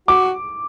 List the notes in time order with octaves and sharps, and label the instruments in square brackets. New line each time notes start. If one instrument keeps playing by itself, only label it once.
[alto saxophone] F#4 [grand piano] D6